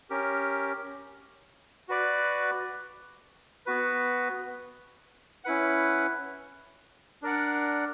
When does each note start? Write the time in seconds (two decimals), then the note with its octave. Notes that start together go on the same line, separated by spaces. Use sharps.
0.10 C#4 G4 A#4
1.88 F#4 B4 D5
3.66 B3 F#4 B4
5.44 C#4 E4 B4 F#5
7.22 D4 A#4 D5 F#5